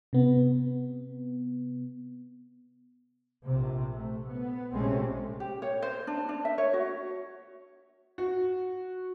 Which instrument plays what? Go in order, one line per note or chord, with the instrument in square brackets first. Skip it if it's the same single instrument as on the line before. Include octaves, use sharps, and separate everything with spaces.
[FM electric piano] C3 B3
[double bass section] A#1 C3
A3
B3
A#1 C3 G#3 A3 C4 C#4
[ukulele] G4
C#5
C5
D4
D4
E5
C#5
F#4
[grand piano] F#4